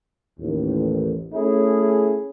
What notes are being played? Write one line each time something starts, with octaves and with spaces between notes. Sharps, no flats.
A1 D#2
A3 C#4 E4 G#4